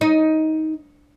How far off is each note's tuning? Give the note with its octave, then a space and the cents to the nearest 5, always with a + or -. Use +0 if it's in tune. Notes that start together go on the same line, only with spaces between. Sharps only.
D#4 +15